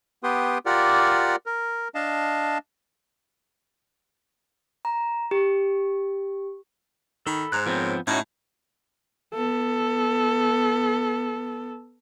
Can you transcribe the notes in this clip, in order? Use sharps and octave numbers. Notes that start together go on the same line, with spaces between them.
B3 G4 B4 G5 C6 D#6
F4 G4 A#4 D5 F#5
A#4
D4 D#5 F5 A5
A#5
G4
D#3 A4 B5
G#2 C5 A#5 F#6
F3 B3 C4 A#4 C#5
A2 C#4 D#4 F#4 E5
B3 A4